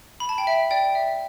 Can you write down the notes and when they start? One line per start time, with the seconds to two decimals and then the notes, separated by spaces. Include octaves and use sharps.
0.20 B5
0.29 A5
0.38 G5
0.47 E5
0.71 D5 G5
0.95 E5